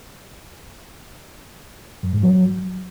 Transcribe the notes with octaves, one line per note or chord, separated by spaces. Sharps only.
F#2
G#2
F#3